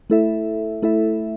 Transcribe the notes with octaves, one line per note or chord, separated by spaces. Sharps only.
A3 E4 A4 E5
A3 E4 A4 E5